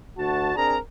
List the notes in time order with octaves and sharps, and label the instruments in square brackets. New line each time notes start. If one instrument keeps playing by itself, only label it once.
[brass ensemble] D2 F#4 A5
C4 D4 G#4 A#4 A#5